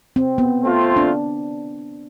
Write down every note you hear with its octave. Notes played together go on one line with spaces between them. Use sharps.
C4
B3
A3 C4 F4
D4